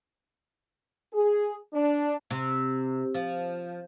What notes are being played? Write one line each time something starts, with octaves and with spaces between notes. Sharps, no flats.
G#4
D4
C3
F3